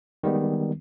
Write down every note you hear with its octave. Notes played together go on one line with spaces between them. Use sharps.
D#3 G3 G#3 B3